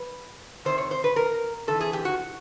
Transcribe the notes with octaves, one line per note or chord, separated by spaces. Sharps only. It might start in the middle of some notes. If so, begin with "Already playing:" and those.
Already playing: B4
C3 D#3 C5
C#5
C5
B4
A#4
C3 E3 A4
G#4
G4
F#4